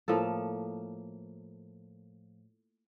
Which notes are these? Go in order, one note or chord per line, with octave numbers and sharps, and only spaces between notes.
A2 F3 A#3 A4